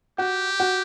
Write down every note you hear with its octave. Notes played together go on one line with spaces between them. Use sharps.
F#4 G4
F#4